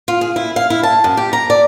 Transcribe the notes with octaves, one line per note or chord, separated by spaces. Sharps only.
F4
G#4
E4
F5
E4
A5
F#2
G4
A#5
D5